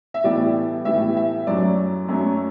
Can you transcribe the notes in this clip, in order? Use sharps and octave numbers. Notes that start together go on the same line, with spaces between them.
E5
A2 E3 G3 B3 D5
A2 E3 G3 B3 E5
E5
F#2 F#3 A3 D5
F#2 F#3 A3